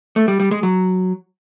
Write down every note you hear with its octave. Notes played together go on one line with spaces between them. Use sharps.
A3
G3
G3
G#3
F#3